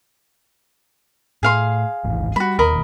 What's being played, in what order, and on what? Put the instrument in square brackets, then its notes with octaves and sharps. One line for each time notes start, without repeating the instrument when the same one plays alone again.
[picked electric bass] A2 [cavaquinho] G#4 F5 C6
[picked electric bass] D1 G#1 E3
[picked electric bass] G3 [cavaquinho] F#4 B5
[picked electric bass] E1 D#2 [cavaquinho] A#4 D#5 B5